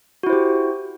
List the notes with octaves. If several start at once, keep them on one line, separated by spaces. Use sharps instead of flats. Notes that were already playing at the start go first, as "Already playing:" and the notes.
E4 F#4 G4 C5